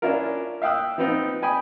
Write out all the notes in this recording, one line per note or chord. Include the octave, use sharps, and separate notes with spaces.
C#4 D4 E4 F4 A#4
E5 F5 G5 D#6 E6 F#6
F3 B3 C4 D#4 F4
G5 G#5 B5 D#6